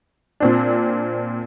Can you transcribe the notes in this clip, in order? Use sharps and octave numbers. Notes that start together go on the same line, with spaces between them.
A#2 C4 D4